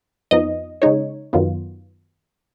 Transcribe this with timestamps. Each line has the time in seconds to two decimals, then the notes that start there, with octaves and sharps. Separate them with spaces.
0.31 F2 F3 B3 D#4 D#5
0.82 C#3 G#3 D#4 C#5
1.33 F#2 D#3 F#3 B3 F4